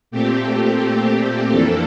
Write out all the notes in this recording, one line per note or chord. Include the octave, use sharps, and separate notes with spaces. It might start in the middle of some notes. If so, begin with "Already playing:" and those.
A#2 A3 C4 G4
F2 E3 A#3 D4 A4